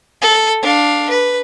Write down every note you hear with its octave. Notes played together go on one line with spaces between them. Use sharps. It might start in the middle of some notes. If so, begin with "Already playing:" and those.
A4
D4 F5
B4